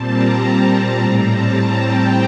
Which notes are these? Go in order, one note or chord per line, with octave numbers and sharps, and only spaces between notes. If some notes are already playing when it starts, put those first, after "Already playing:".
Already playing: A#2 G3 C4 A5
A#5
A#5
A2 G3 C4
A5
G5